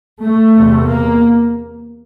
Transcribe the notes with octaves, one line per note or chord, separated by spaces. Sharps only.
A3
E2 C3
A#3